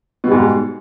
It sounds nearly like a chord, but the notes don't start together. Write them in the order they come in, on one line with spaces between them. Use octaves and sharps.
B2 G3 G#2